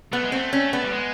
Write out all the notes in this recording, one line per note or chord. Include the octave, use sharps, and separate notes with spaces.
A3 B3
G#3
A3 C4
C#4
B3
G3
G#3